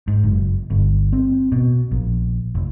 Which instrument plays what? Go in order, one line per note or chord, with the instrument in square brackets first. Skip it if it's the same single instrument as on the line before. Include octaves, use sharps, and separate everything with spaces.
[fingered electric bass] G#2
F#1
G1
C4
B2
A#1
F1